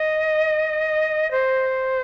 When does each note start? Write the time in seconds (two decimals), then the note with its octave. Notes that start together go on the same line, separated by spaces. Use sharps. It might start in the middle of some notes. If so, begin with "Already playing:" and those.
Already playing: D#5
1.31 C5